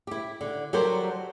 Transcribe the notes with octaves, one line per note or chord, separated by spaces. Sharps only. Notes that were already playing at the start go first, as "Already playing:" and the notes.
E4 G4
D3
F#3 G3 G4 A4 A#4 C5